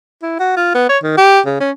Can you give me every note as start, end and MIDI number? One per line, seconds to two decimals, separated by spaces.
0.23 0.35 64
0.40 0.55 66
0.57 0.74 65
0.75 0.88 59
0.89 0.98 73
1.03 1.15 51
1.18 1.40 67
1.46 1.58 49
1.60 1.71 61